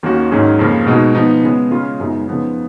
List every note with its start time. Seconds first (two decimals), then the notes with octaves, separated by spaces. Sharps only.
0.03 D#2 D#3 A#3 C#4 F#4
0.31 G#2 D#3 F#3 C#4 G#4
0.59 F2 C#3 F3 A#3
0.87 B2 G#3 D#4 F#4
1.15 F3 B3 D#4
1.43 C#3 G#3 B3
1.71 C#3 G#3 C#4 F4
2.00 F#2 C#3 G#3 B3 D#4
2.28 C#3 F3 B3 D#4